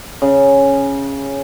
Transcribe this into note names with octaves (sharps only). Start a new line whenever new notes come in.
C#3